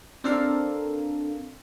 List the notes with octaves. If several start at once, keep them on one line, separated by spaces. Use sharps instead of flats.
C4 D4 A4 A#4 F5